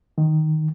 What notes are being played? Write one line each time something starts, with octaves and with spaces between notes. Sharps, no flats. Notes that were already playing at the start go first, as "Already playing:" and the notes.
D#3